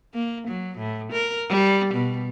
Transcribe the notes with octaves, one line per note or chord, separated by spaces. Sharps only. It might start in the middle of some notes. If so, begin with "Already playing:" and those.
A#3
F#3
A2
A#4
G3
B2